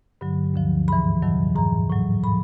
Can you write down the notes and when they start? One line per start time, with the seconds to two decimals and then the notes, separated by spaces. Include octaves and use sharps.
0.21 G2 D3 F#3
0.54 D2 D3 F3
0.88 G#2 E3 B5
1.22 F2 C3 D#3 F#3
1.56 G#2 E3 A#5
1.90 A2 F#3
2.23 A2 F3 B5